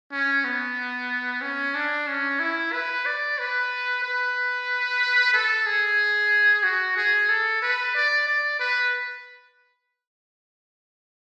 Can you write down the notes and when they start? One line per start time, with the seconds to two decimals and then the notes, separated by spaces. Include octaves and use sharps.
0.12 C#4
0.45 B3
1.42 C#4
1.75 D4
2.08 C#4
2.40 E4
2.73 B4
3.06 D5
3.39 B4
4.03 B4
5.34 A4
5.66 G#4
6.64 F#4
6.97 G#4
7.29 A4
7.62 B4
7.95 D5
8.28 D5
8.60 B4